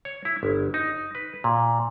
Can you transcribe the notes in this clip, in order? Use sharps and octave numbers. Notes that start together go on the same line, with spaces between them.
C#5
E4
G1
D#4
B4
A#2